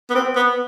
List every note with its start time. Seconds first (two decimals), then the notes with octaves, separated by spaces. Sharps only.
0.10 B3
0.15 C4
0.36 B3